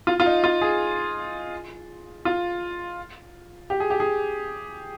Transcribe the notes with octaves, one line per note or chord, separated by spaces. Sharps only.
F4
F4
D#4
F4
G#4
F4
G4
G#4
G4
G#4